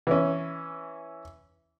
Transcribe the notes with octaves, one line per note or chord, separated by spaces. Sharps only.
E3 C#4